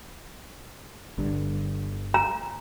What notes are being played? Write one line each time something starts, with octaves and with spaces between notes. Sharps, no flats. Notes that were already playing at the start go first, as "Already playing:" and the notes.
G1 G2 D3
A#5